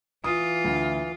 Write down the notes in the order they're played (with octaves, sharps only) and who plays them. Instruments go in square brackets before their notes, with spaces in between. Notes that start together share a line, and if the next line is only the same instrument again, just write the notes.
[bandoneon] E3 [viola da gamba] F4 [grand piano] D#6
[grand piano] D2